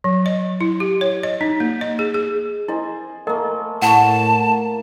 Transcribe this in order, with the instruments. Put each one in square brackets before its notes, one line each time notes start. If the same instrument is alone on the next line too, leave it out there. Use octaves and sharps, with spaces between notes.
[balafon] F#3
D#5
E4
G4
C#5
D#5
D#4
A#3
D#5
G#4
G#4
[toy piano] E4 [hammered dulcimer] C5 D#5 G#5
[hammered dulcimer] A3 A#3 [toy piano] A#4 D#5
[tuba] A2 [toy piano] F#5 C#6 [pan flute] A5